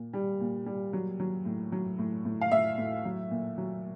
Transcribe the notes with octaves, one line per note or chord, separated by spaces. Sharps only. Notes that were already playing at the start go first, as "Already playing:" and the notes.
Already playing: A#2
G3
A#2
G3
F#3
F#3
A2
F#3
A2
A2
F5
A2 E5
A2
F#3
A#2
F#3